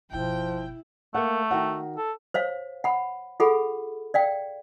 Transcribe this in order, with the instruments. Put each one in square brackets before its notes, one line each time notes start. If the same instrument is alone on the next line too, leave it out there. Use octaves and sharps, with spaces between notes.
[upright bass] G1 B2 [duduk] F3 [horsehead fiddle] E4 [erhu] G5
[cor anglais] A3 [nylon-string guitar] A#3 F#5
[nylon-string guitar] D#3 F#4 F#5
[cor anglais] A4
[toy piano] C5 C#5 F5
F#5 B5
F4 G#4 A4 F#5 B5
D5 F5 G5